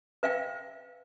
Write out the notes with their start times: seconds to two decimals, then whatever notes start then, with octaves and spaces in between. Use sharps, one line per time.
0.23 B4 E5 F5 G5